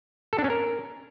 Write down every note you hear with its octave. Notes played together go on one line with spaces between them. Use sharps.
A4
D4
C#4
A#4